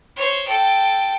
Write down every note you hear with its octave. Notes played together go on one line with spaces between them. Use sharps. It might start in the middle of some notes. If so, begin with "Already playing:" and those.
C5 C#5
A4 G5